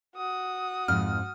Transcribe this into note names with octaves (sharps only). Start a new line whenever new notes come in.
F#4 D#6
F2 G#2 F6